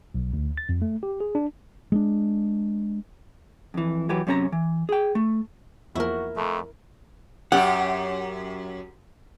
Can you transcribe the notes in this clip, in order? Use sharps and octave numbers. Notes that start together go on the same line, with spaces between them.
B1
D2
A6
F2
A3
G4
G#4
D4
G#3 B3 D4
F2 E3
E3 F#3 G4 B4
F#2 C3 C#4 A4 A#5
E3
G#4 G5
A3
E2 F3 A#3 E4 F#4 A#4
F2 A3
F#2 G4 F#5